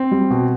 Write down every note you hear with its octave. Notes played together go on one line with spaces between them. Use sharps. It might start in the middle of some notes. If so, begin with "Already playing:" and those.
Already playing: C4
G3
B2